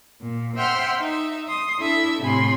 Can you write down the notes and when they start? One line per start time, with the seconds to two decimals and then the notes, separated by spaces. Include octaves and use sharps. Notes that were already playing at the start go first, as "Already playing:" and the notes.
0.20 A#2
0.56 C5 E5 F#5 G5 C6 F6
1.00 D#4 E5
1.47 C6 D#6
1.77 D4 E4 A4 E5
2.21 A2 C3 G#5 B5 C6